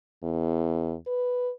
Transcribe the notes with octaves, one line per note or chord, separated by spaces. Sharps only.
E2
B4